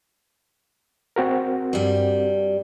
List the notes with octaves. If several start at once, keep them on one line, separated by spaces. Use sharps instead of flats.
C4 F#4 A#4
G2 G3